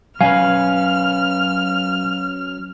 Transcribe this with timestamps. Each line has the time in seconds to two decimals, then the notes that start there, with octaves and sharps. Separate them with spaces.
0.21 F#3 C#4 B4 F5 G#5 F6